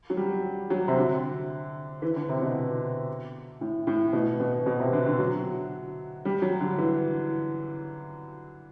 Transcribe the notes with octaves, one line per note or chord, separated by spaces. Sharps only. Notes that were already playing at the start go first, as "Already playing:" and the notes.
F#3
G3
F#3
C3
D3
E3
D3
C3
B2
A2
A2
B2
B2
B2
C3
D3
D3
F#3
G3
F#3
D3
E3